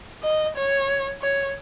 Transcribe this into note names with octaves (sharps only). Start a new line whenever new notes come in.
D#5
C#5
C#5